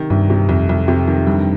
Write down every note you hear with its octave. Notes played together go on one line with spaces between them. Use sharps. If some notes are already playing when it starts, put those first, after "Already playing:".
Already playing: C3 D#3
C2 G2
C3
C2 F2
C2
C3
D#3
G2